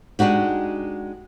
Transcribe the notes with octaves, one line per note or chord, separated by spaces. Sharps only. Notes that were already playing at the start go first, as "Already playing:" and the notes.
G#3 D4 D#4 F#4 G4